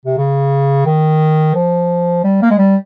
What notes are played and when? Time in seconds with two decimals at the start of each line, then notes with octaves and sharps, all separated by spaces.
0.06 C3
0.18 C#3
0.86 D#3
1.55 F3
2.24 G3
2.42 A#3
2.50 G#3
2.58 G3